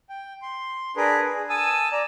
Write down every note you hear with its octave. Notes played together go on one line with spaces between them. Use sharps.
G5
C6
D4 G#4 A#4 B4
G#4
G#5 A5 D#6 E6
D5 A#5